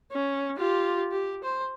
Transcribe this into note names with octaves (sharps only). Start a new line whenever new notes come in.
C#4
F4 G4
G4
C5